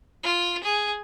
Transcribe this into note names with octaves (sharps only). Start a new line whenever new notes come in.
F4
G#4